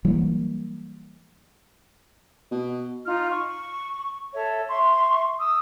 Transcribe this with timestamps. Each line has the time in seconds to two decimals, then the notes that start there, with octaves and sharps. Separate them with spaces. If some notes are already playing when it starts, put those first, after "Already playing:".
0.05 E3 F#3 G3 A#3
2.51 B2
3.05 D#4 F4 F6
3.30 C#6
4.33 A4 C#5 E5
4.68 E5 C6 C#6
5.39 D#6 E6